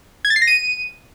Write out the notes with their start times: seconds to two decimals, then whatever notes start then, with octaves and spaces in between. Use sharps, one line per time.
0.25 G#6
0.30 A6
0.36 C7
0.42 A#6
0.47 D#7